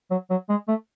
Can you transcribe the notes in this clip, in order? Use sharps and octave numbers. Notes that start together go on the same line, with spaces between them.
F#3
F#3
G#3
A3